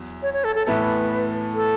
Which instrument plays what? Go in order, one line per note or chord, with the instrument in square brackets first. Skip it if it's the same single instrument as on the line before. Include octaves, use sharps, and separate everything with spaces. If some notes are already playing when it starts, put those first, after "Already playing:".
Already playing: [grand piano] E2 F#3
[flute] C#5
C#5
A4
A4
[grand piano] A2 E3 B3 E4 A4 [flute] B4
[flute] A4